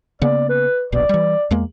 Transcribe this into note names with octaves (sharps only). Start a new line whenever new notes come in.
C#3 A#3 B3 D5
B4
D1 A#1 B2 D5
E3 G3
E2 G#3 A#3